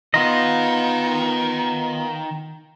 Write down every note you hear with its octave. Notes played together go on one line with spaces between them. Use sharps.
D#3 B3 F4 D#5